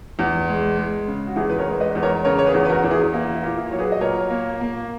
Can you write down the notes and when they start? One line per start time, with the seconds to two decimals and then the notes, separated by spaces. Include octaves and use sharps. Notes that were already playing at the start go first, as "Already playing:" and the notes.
0.19 E2
0.48 G#3
0.77 G#3
1.07 C#3
1.27 F#4
1.36 E2 E4 G#4
1.50 B4
1.58 A#4 C#5
1.65 G#3
1.80 B4 D#5
1.95 E2
2.03 A#4 C#5
2.24 C#3 A#4 C#5
2.39 C#5
2.46 G#4 B4
2.54 E2
2.65 B4
2.69 F#4 A#4
2.84 E2
2.90 E4 G#4
3.13 A#3 E4
3.34 E4
3.43 A#2
3.58 E4
3.71 F#3 C#5
3.79 G#4 B4
3.92 D#5
4.01 A#2 A#4 C#5
4.30 A#3
4.61 A#3